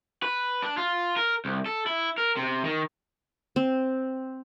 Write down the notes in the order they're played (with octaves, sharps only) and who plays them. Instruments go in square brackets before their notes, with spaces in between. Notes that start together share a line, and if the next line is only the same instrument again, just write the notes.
[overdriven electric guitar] B4
D4
F4
A#4
C2
A4
E4
A#4
C3
D#3
[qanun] C4